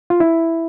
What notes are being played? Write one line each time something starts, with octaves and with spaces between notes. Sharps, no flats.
F4
E4